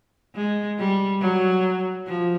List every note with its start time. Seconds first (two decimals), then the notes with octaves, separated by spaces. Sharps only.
0.36 G#3
0.79 G3
1.21 F#3
2.07 F3